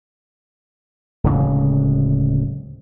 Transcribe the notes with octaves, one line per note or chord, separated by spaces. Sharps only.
D1 C#3 G#3